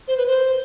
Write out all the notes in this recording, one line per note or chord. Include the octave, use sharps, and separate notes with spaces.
C5
B4
C5